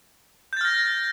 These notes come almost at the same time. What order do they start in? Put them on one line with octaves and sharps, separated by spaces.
G6 A6 F6 A#6